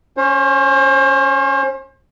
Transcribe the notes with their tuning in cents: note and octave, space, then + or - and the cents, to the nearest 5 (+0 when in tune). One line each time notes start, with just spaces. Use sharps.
C#4 +0 C5 +40